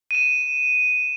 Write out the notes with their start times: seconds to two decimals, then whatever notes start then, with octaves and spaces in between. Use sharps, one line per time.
0.11 D#7 E7